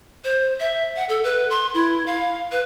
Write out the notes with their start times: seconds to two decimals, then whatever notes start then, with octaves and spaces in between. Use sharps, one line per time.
0.24 C5
0.60 E5
0.96 F#5
1.09 A4
1.24 B4
1.50 C6
1.74 E4
2.06 F5
2.52 B4